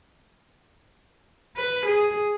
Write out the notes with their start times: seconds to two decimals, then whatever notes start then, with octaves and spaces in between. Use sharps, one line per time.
1.57 B4
1.86 G#4